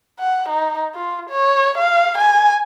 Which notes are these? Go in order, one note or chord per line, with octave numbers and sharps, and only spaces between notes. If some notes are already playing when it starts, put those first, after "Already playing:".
F#5
D#4
F4
C#5
F5
G#5